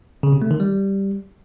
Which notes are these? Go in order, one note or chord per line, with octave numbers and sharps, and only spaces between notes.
C#3
C3
A3
D#3
G3